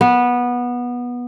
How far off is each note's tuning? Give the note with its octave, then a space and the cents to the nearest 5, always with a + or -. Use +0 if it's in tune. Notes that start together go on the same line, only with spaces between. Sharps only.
B3 -15